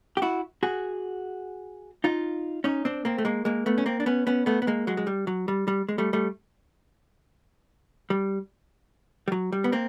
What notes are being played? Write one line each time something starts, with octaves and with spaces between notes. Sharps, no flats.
G4
E4 F#4
F#4 G#4
D#4 F4
C#4 D#4
C4 D4
A#3 C4
A3
G#3 A#3
G#3 A#3
A3 B3
C#4
A#3 C4
D4
B3 C#4
B3 C#4
A3 B3
B3
G#3 A#3
F#3 G#3
G#3
G3
F#3
G3
G3
G#3
G3 A3
G3 A3
G3
G3
F#3
G3
B3
A#3 C4